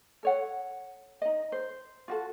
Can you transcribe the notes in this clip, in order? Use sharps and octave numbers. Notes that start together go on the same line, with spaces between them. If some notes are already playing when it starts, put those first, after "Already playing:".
A4 C#5 F#5
D#4 D#5
C5
F4 F#4 A4